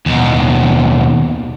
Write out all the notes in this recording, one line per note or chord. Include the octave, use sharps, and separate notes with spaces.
D#2 B2